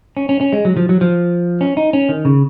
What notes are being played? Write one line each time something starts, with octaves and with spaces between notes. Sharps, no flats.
C#4
C#4
C#4
G#3
F#3
F3
F#3
F3
C#4
D#4
C#4
D#3
C#3